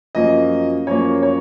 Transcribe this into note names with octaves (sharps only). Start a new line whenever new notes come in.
F#2 F3 A#3 D#5
F#2 F3 A#3 C#5
C#5